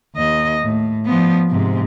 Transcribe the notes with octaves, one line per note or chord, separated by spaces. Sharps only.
D#2 D#5
A2
F3 B3
G#2 C3